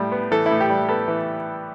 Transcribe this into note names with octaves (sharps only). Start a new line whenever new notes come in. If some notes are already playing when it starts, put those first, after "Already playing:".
Already playing: A2 G3
B3
E3 A4
E4
A2
G4
G3
B3 A4
E3